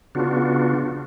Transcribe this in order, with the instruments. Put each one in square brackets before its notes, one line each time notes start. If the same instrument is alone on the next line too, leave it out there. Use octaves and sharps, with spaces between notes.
[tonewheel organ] C#3 B3 D4 F4 F#4